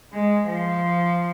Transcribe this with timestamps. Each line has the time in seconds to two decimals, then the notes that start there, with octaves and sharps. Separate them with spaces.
0.13 G#3
0.47 F3